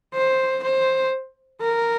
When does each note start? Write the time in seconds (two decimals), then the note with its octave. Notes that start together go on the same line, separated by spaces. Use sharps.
0.14 C5
0.63 C5
1.60 A#4